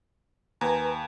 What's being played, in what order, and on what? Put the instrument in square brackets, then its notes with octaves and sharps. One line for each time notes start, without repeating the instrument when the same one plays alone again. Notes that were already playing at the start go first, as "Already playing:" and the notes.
[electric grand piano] D#2 [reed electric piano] B4 G#5 A#5